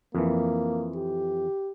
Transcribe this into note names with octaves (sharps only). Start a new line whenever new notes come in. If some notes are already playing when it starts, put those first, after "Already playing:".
F2 E3 A#3
G4